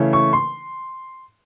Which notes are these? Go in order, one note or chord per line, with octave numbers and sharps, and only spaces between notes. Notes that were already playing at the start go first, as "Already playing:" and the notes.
Already playing: C#3 E3 A3 C#4
C#6
C6